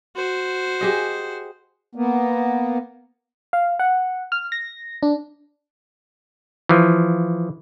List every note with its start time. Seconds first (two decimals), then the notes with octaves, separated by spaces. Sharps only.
0.16 F#4 C5
0.81 G4 G#4 D#5
1.95 A#3 B3
3.53 F5
3.80 F#5
4.32 F6
4.52 A#6
5.03 D4
6.69 E3 F3